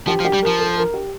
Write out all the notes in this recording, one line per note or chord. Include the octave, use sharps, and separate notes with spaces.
F3 G4
F3
G4
G3
F3 A#4
A4
A#4
G4